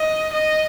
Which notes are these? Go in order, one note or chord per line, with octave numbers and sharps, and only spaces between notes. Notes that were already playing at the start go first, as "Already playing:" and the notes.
Already playing: D#5
D#5